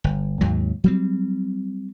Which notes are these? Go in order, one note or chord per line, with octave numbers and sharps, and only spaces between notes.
G1
D#2 G#2 F#3
F#3 G3 C4